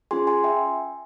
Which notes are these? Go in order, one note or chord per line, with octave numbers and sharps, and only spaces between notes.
C#4 F4 G#4 G#5 C6
G#5 C6
E5 G5